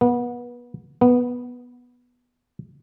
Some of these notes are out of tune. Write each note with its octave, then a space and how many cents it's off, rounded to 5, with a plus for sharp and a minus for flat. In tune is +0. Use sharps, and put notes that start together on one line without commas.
B3 -30
B3 -10